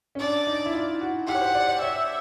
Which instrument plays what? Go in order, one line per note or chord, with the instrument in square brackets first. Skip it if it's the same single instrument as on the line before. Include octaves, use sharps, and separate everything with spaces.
[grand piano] C#4
[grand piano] D4 [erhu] D5
[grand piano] D#4
E4
F4
F#4
[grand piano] G4 [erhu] F#5
[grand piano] C#5
C5
D5
D5
[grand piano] C#5 [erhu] E5